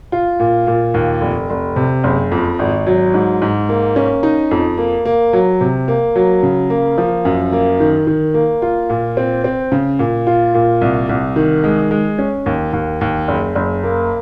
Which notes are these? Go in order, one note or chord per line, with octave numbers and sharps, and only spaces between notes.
F4
A#2
A#2
D#2
F1
F1
C3
F#1
F2
G#1
F#3
G#2
G#2
A#3
C#4
D#4
F2
A#3
A#3
F#3
C3
A#3
F#3
C#3
A#3
F3
F#2
A#3
D#3
D#3
A#3
F4
A#2
C4
C4
C#3
A#2
F4
A#2
C2
C2
D#3
G#3
G#3
C#4
D#2
D#2
D#2
F#1
F#1
A#3